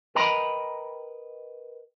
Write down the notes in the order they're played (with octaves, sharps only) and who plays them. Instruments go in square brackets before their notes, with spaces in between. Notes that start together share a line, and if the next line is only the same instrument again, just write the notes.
[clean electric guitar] A#4 B4 D#5 G5 A#5 B5